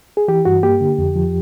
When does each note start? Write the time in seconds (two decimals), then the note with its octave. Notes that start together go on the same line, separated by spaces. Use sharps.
0.17 G#4
0.28 E3 G4
0.45 G2 F#4
0.63 A#3 G4
0.81 D3
0.98 F2
1.16 F3